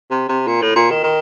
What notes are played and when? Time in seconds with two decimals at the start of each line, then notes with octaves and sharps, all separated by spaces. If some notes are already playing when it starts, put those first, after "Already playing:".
0.11 C3
0.29 C3
0.47 A#2
0.62 A2
0.76 A#2
0.91 D#3
1.04 D#3